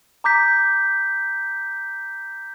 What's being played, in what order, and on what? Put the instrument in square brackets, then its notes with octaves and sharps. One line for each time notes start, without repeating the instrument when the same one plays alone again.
[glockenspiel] A#5 D6 G6 B6